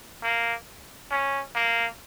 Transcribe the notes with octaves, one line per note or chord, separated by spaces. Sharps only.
A#3
C#4
A#3